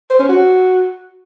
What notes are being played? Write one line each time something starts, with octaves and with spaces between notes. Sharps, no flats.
C5
C#4
F#4